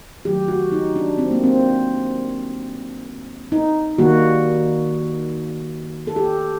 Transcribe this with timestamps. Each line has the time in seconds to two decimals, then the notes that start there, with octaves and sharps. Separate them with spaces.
0.25 D#3 F#3 A3 G4
0.48 F#4
0.72 D#4
0.96 D4
1.18 C4
1.31 A#3
1.44 C4
3.52 D#4
3.98 D#3 G3 A#3 F#4
6.07 A4
6.16 G4